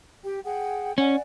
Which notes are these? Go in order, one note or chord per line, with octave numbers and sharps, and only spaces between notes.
G4 G5
G#4 F#5 G5
C#4 D5 F#5 G#5